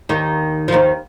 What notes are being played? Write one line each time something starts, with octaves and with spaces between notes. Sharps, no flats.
D#2 D#3
F3
D#2 D#3